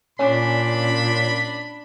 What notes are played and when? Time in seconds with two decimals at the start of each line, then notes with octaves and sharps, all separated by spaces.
0.19 A#2 C#4 D4 B5